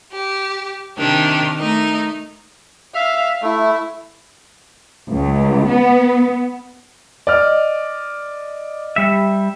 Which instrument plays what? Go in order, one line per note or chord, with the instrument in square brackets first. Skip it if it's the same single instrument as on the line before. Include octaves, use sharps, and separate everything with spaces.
[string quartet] G4
C3 D#3 D4 G4 A#4
A3 D#4 A#4 D#5
[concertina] E5 [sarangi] F5
[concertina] A3 [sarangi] E4
[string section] C#2
B3
[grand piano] D5 D#5 F6
[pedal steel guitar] G3 E5